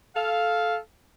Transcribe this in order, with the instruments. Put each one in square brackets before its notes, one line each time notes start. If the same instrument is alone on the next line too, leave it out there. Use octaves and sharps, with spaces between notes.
[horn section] A4 F5